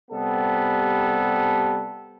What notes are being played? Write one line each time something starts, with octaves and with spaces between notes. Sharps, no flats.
C3 G3 B3 A4